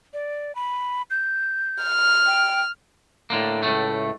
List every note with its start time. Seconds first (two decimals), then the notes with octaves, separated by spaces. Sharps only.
0.14 D5
0.55 B5
1.10 G6
1.83 F6
2.27 G5
3.30 A2 D3 A#3
3.63 C#2 A2 A3